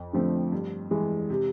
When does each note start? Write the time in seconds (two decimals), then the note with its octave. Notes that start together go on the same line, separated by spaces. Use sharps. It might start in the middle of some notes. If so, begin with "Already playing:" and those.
Already playing: F2
0.13 D3 F3 A3 C4
0.52 G2
0.91 E3 G#3
1.30 C3